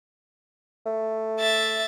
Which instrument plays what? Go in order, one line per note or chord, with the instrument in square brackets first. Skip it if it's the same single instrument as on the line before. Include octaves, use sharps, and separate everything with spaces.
[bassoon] A3
[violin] E5 A6